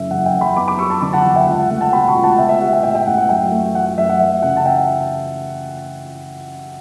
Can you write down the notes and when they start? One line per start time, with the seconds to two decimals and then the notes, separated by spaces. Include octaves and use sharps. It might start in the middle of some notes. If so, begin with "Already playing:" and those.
Already playing: F#1 C#3 E5
0.11 E2 F#5
0.26 E5 G5
0.33 F#1
0.41 G5 B5
0.56 B3 B5 D6
0.68 B5 D6
0.79 G3 C#6 E6
0.90 A5 C#6
1.02 D3 B5 D6
1.13 F#5 A5
1.25 E2
1.36 E5 G5
1.47 C#2 F#5
1.59 F#5
1.70 A3 F#5
1.81 F#5 A5
1.92 B2 G5 B5
2.08 A5 C#6
2.16 C#2
2.24 F#5 A5
2.38 B3 E5 G5
2.49 E5
2.61 G3 F#5
2.73 E5 G5
2.83 A2 E5 G5
2.94 E5 G5
3.07 A1 F#5
3.18 F#5
3.29 F#2 E5 G5
3.51 A3
3.74 E3 F#5
3.86 F#5
3.97 F#2 E5
4.09 F#5
4.20 E3 E5
4.42 C#3 F#5
4.57 A5
4.65 E5 G5